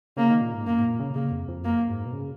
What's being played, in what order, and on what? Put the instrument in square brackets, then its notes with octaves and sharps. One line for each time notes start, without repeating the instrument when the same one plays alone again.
[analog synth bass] C#3 [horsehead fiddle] A#3
[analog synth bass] D#3
A#2
G#2
[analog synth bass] F#2 [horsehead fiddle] A#3
[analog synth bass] G#2
A#2
C#3
[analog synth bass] C#3 [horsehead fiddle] A#3
[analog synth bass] F2
F2
[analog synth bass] F#2 [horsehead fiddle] A#3
[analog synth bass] G#2
B2
C#3